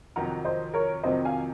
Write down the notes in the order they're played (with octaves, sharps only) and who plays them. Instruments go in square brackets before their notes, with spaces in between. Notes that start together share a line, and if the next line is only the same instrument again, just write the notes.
[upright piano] F2 C3 D#3 F#3 [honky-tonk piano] F#5 A#5
[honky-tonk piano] C5 D#5
A#4 C#5
[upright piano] F2 C3 D#3 F#3 [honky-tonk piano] C5 D#5
[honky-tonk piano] F5 G#5